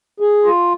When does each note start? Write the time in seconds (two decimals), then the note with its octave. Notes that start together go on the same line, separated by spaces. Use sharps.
0.20 G#4
0.44 F4